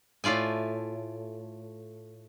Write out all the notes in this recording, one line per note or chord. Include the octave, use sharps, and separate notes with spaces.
A2 A3 F4 D5 G#5